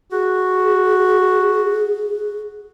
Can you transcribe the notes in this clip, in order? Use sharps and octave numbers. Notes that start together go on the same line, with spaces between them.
F#4 G#4